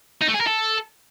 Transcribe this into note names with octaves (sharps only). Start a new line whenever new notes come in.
D#4
A3
G#4
A#4
A4